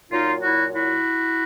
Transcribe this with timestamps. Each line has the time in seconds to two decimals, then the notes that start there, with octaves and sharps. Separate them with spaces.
0.11 A#2 F#3 D#4 F4
0.42 E4 F#4
0.73 E4 F#4